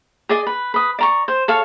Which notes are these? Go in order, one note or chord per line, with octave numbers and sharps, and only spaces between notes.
G#4 D5 D#5
B4
B4 D#6
D5 A#5 C#6
C5
A4 C#5 F5